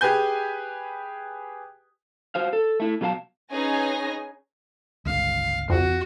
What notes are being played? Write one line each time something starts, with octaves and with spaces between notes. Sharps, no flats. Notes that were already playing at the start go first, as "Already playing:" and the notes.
G4 G#4 B4 G#5 G6
F#4 C5 F5
A4
A3 E4
B2 F#3 F#4 A#4 F5 A5
C#4 D#4 G#4 B4 G#5 A#6
G1 C#2 F5
F2 F#4